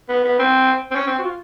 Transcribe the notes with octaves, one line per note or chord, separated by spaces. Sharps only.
B3
B3
C4
C4
C#4
C4
F#4
F4